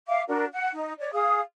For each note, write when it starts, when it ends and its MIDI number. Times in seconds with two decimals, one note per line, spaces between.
0.07 0.22 76
0.07 0.22 77
0.07 0.22 86
0.28 0.45 62
0.28 0.45 66
0.28 0.45 70
0.52 0.69 78
0.72 0.93 63
0.99 1.11 73
0.99 1.11 74
1.13 1.40 68
1.13 1.40 77
1.13 1.40 87